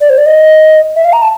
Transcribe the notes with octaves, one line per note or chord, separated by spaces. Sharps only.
D5
C5
D5
D#5
E5
F5
A#5
A5